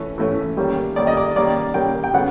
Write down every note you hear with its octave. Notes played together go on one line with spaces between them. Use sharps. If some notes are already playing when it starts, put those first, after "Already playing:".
Already playing: E3 A3 C#4
E3 A3 C#4
D#3 G3 A#3 C#4
D#3 G3 A#3 C#4 D5
D#5
D5
D#3 G3 A#3 C#4 D5
D#3 G3 A#3 C#4 G5
G5
C#3 F#3 B3 F#5